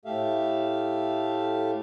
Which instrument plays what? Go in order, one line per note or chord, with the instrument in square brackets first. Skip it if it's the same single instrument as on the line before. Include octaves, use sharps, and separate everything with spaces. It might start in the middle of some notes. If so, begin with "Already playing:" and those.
[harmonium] A2 A3 G4 A4 E5 F5